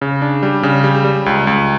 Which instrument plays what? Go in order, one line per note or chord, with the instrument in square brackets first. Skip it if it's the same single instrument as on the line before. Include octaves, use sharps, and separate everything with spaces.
[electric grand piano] C#3
D4
G3
C#3
G3
G3
C#2
C#2